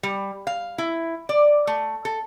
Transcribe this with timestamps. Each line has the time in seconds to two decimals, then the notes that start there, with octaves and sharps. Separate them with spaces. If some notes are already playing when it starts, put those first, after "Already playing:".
0.03 G3
0.47 F5
0.78 E4
1.29 D5
1.67 A3
2.05 A4